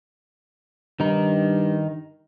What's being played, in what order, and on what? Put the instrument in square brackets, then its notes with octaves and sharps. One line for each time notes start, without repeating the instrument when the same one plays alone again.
[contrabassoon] G2 [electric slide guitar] D#3 D#4